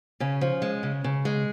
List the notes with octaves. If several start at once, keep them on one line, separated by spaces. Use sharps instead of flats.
C#3 C#4
F3
G#3
C#3
C#3
G#3